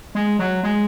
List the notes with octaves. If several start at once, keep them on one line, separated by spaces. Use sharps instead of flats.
G#3
F#3
G#3